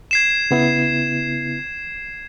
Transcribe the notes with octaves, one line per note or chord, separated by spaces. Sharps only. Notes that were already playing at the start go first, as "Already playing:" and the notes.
G#6 C7 E7
C#3 B3 E4